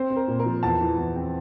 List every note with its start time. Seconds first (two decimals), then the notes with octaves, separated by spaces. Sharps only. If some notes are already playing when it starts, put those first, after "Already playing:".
Already playing: C4 C5
0.10 C4
0.16 A#4
0.28 A#2
0.40 A#4
0.46 F3
0.63 E2 A5
0.81 E3
0.98 E2
1.16 C4